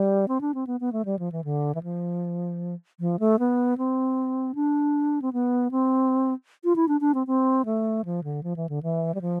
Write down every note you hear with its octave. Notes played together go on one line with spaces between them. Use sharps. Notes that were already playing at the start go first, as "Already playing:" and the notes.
Already playing: G3
C4
D4
C4
B3
B3
A3
G3
F3
E3
D3
E3
F3
F3
A3
B3
C4
D4
C4
B3
C4
F4
E4
D4
D4
C4
C4
A3
F3
D3
F3
E3
D3
E3
G3
F3